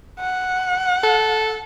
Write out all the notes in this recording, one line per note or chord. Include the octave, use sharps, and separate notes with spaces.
F#5
A4